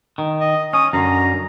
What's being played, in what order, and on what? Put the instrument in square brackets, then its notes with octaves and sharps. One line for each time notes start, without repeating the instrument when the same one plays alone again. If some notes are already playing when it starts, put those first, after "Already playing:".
[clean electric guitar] D#3
[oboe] D#5
[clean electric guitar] C#4 [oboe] D#6
[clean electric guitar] F#2 D3 [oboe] A#5